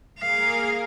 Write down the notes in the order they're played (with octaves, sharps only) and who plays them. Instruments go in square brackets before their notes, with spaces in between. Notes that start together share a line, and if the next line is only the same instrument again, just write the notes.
[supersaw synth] A#3 G#4 A#4 [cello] F5